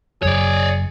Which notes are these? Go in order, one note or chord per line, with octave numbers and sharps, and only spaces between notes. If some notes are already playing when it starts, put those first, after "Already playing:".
F#1 F#2 G#4 C#5 D5